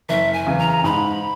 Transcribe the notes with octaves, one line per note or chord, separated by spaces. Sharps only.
F#1 E5
G#5
E2 C#3
A#5
G#2 B5